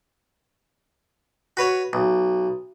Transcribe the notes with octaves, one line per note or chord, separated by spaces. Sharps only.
F#4 B4 C#5
B1